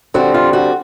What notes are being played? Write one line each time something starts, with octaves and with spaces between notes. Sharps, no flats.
D3 G3 C4 F#4
F4
F#4